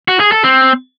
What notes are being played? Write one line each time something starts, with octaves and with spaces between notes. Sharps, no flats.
F#4
G#4
A4
C4